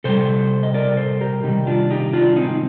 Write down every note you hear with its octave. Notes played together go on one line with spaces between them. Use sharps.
C3 G3 A4 C5
D#5
A#4 D5
A4 C5
G4 A#4
C3 D#3 G3 D#4 G4
D4 F4
D#4 G4
D4 F4
C4 D#4